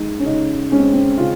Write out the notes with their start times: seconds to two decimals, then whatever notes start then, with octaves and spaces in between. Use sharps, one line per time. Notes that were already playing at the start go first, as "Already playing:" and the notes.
Already playing: G#3 D#4
0.20 C#4
0.25 C#3 D#4
0.72 G#3 C#4
0.79 C4
0.93 C4
1.18 C#3 F4